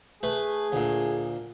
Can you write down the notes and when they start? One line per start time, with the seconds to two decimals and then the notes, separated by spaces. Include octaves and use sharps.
0.23 A3 G#4 B4
0.72 D2 A#2